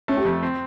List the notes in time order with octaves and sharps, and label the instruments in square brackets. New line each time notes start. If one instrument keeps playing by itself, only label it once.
[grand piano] A3 [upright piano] C#4
[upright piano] G4
[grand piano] F2
C4